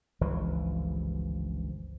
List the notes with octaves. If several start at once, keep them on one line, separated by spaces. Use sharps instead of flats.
G1 C#2 E3 F3